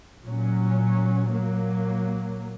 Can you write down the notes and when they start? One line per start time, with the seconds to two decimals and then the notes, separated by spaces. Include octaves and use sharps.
0.23 A#2 F#3 C#4
1.30 A#2 F#3 A#3